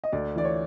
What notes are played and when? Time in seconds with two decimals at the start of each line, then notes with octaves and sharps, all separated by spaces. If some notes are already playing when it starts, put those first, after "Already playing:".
0.04 D#5
0.12 D2 D5
0.36 E3 D5
0.44 C#5